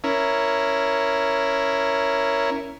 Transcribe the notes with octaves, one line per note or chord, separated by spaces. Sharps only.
C#4 E4 A#4